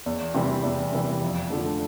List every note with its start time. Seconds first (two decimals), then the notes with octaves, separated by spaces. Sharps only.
0.06 E2
0.34 C3 E3 G3
0.63 E2
0.92 C3 E3 G3
1.21 F2
1.50 D3 F3 A3